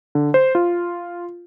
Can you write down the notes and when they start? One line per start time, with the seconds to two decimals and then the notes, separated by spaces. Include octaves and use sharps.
0.15 D3
0.34 C5
0.55 F4